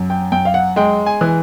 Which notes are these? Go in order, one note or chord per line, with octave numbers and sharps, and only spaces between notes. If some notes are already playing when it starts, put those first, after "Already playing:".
Already playing: F#2
G5
F#2 G5
F5
F#5
G#3 G5
G#5
E3